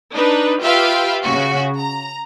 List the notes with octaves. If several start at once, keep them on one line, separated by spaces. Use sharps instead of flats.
D4 D#4 B4
F4 G4 B4 E5 F5 G5
C#3 F#4
A#5